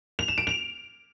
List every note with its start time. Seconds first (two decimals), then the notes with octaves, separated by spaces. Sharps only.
0.19 F7
0.28 E7
0.38 D7
0.47 F7